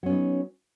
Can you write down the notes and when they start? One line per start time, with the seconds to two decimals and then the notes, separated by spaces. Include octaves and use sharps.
0.03 F#3
0.06 C#4
0.09 B3
0.12 D#4